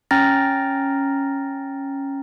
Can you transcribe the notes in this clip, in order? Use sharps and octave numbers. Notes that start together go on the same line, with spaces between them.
C#4 G5 A#5 F6 A6 A#6